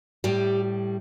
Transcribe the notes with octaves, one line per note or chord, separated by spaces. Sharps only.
A2 G3 G4